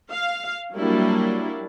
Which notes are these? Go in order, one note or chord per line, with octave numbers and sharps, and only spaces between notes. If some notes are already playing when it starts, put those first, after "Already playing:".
F5
F#3 G3 A#3 D4 E4